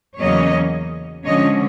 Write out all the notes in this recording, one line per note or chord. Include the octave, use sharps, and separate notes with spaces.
E2 C#3 F#3 A#3 C#4 C#5 D#5
D3 F3 G#3 C#4 C#5 D#5